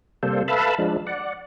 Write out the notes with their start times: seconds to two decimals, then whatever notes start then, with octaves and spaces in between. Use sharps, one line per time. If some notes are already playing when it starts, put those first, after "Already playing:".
0.23 C3 G3 A#3 A4 C5
0.48 A4 B4 E5 F5 A5 B5
0.78 F3 G#3 D4
1.07 D5 F#5